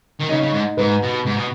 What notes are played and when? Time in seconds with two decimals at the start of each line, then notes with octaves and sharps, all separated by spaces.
0.20 D#3
0.29 C#3 D#4
0.42 C#3
0.53 G#2
0.77 G#2 B4
1.02 B2
1.26 G#2
1.36 B2